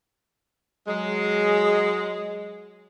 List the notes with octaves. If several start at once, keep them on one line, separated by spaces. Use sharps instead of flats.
F#3 G#3